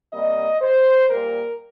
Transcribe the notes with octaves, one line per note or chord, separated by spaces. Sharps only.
C3 G3 A#3 D#5
C5
A#2 G3 A#3 A#4